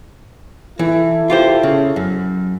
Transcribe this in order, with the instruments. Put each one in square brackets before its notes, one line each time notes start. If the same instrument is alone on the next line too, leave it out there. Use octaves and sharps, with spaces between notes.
[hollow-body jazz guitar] E3 [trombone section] E4 A4
[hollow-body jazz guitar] F4 G4 C5
C#3
F#2